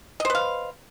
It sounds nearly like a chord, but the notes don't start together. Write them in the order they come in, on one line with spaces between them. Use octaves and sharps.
D#5 C5 B4 F5